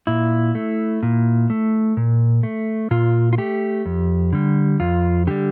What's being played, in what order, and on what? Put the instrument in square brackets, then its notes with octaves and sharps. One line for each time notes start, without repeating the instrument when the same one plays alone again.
[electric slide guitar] A#2 E4
A3
A#2
A3
A#2
A3
A#2 F4
F4
A3 G4
F2
D3 G3
F2 F4
D3 G3 G4